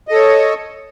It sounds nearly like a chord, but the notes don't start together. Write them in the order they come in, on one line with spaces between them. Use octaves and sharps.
D#5 A4 C#5